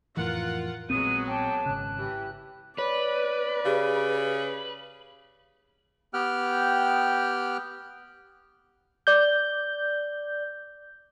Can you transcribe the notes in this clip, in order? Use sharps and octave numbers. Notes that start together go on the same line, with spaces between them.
F2 A2 E3 F4 A#4 F#5
A#1 F#3 G#3 B3 C4 D#6 D#7
C#5 G5 A5 D6
G#1 C#3 F#6
E3 G4
B4 C#5 D5
C#3 G4 G#4
B3 G4 G5 F6 F#6
D5 G6